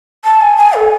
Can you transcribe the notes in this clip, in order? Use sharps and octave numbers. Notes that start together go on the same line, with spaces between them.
A5
G#5
G#5
A4